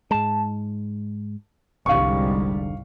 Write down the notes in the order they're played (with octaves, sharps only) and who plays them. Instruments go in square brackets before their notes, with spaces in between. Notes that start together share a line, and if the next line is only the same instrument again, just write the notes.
[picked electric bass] G#2 G#3 [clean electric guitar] A5
[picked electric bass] F1 D3 [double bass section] C2 G#2 G3 [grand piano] F5 C#6